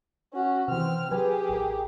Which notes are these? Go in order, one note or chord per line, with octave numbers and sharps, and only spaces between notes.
C#4 F#4
C3 E3 C4 F6
F#3 G4 G#4 B4 G#5
A1 A#4